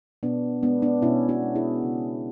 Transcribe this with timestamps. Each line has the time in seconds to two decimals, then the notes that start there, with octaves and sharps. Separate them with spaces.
0.23 B2 B3 D4
0.63 G#3 B3 D4
0.82 B3 D4
1.02 B2 C#4 E4
1.29 D4 F#4
1.42 G#3
1.56 E4 G#4
1.83 C#3